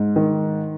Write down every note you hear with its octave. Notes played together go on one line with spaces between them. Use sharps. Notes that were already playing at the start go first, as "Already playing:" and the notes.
Already playing: G#2
D#3